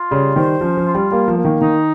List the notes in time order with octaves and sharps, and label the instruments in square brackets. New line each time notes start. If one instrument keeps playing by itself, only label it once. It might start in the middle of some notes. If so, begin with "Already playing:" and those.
Already playing: [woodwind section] F4
[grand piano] C#3 [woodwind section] G3
[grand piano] D#3 [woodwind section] C5
[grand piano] F3 [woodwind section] C#4
[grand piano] F3
[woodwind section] F4
[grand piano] G3
[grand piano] G3 [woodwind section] A#3
[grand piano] F3
[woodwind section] A#3
[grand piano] D#3
[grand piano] D#3 [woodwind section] D#4